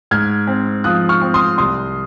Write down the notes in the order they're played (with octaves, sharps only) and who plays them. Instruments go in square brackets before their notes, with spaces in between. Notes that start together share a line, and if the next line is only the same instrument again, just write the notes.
[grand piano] G#2 [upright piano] F6 G#6
[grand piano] C4
[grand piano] F3 [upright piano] D#6 F#6
[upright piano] C#6 F6
[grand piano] C4
[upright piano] C6 D#6
[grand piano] C2 [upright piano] C6 D#6